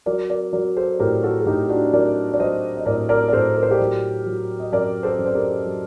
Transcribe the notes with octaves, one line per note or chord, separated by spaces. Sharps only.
F#3 A#4 D5
A#4 D5
F#3 A#4 D5
A4 C5
A2 G4 A#4
F#4 A4
A4
A2 D#4 G4
D4 F#4
F#3 A#4 D5
D5
F#3 C5 D#5
D#5
A2 A#4 D5
A#4 D5
D5
A2 A4 C5
A#4
C5
G4 A#4
F#3
F#3
D#5
F#2 A#4 D5
A4 C5
F#2
C5
G4 A#4
F#3